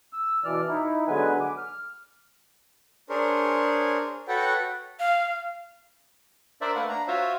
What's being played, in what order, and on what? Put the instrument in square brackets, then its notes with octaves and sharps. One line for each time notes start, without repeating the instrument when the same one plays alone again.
[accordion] E6
B2 E3 D5 F6
D#4 E4
D3 F#3 G#3 B3 B4 G#5
D6
F6
[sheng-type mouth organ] D4 G#4 A#4 C5 C#5
F#4 A4 B4 C#5 F#5 G5
[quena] F5
[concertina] D4 A#4 C5 D5 E5
A3 A#3 B4 F#5
D4 A#5
F4 F#4 C5 C#5 E5 F5